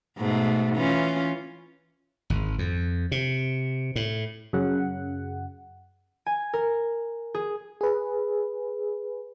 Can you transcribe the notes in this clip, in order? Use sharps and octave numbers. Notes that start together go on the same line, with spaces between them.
G#2 B2 A3
E3 C#4 F4
G#1
F2
C3
A2
F#2 C#3 F#5
G#5
A#4
G#4
G#4 B4